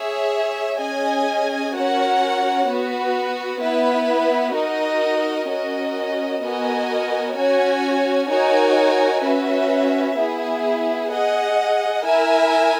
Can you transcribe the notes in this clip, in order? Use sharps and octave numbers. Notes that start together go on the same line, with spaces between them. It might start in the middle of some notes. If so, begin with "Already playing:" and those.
Already playing: G#4 C#5 E5
C#4 G#4 D#5 G#5
C#4 F#4 A#4 C#5 F#5
B3 F#4 B4
B3 E4 B4
D#4 F#4 A#4 D#5
C#4 F#4 A#4 D#5
B3 F#4 A#4 D#5 G#5
C#4 F#4 C#5 G#5
D#4 F#4 A#4 C#5 G#5
C#4 F#4 B4 E5
B3 E4 G#4
G#4 D#5 F#5
E4 A#4 E5 G#5